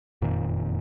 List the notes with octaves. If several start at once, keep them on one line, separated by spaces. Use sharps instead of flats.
F#1 F2 A#2 D#3